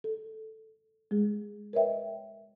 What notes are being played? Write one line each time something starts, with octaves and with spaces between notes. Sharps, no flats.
A4
G#3 G#4
A#4 B4 C#5 D#5 E5 G5